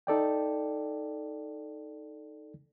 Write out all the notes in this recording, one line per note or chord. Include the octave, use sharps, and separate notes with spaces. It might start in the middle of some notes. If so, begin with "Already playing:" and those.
D#4 A4 D5 G5